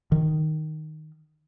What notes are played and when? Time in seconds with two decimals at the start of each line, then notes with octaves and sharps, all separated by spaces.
0.12 D#3